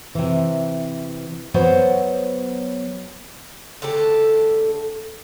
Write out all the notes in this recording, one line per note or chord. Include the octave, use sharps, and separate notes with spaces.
C3 E3
F#3 B3 F#4 C5 C#5 F#5
D3 A3 G4 A4